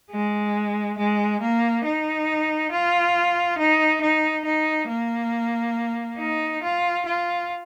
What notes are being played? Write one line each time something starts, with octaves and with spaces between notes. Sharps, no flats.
G#3
G#3
A#3
D#4
F4
D#4
D#4
D#4
A#3
D#4
F4
F4